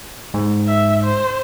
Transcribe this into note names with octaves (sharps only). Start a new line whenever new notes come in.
G#2
E5
C5